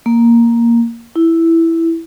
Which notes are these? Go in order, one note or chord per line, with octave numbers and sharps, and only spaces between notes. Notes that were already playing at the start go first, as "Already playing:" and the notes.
A#3
E4